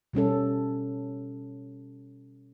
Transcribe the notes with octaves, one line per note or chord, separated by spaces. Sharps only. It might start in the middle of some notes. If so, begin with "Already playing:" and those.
B2 G3 C#4 A4